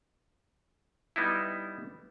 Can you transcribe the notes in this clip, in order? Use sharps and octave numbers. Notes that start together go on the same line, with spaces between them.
G3 B3 D#4 E4